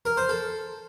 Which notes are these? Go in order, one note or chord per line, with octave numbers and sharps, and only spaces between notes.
A#4
C5
A4